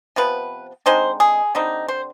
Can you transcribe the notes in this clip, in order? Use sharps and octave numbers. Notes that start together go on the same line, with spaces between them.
C3 F3 B3 B4
D3 G#3 C4 D#4 C5
G#4
D3 G3 C4 D#4
C5